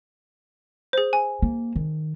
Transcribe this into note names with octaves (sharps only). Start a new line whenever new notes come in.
G#4 C5
G#5
A#3
D#3